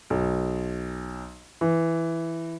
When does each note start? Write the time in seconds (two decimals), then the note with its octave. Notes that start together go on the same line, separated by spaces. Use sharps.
0.10 B1
1.61 E3